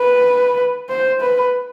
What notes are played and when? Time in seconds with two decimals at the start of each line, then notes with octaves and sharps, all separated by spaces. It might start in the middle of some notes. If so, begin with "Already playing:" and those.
Already playing: B4
0.89 C5
1.21 B4